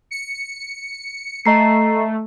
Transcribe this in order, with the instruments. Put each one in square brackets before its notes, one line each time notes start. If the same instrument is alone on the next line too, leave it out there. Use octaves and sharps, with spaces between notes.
[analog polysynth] C#7
[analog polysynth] A3 [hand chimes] D#5 A#5 C7